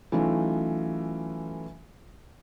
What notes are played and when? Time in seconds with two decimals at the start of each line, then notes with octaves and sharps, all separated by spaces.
0.12 E3 F#3 A3 C#4 D#4 F4